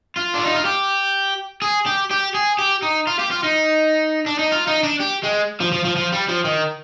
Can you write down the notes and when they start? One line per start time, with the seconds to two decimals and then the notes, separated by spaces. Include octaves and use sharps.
0.17 F4
0.35 D4
0.46 D#4
0.56 F4
0.65 G4
1.62 G#4
1.86 G4
2.11 G4
2.34 G#4
2.59 G4
2.83 D#4
3.07 F4
3.19 G4
3.31 F4
3.43 D#4
4.26 D4
4.39 D#4
4.52 F4
4.68 D#4
4.84 D4
5.00 G4
5.24 G#3
5.60 F3
5.72 F3
5.85 F3
5.96 F3
6.13 G3
6.29 F3
6.45 D#3